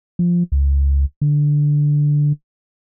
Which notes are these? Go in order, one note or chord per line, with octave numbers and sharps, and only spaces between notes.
F3
C#2
D3